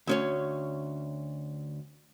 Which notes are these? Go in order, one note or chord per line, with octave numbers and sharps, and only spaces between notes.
D2 C#4 C#5